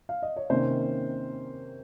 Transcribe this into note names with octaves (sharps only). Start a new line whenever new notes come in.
F5
D#5
C#5
C3 D#3 A#3 C#4 C5